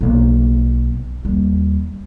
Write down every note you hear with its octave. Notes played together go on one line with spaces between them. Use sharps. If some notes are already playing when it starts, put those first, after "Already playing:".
B1 A#3
D#2 G3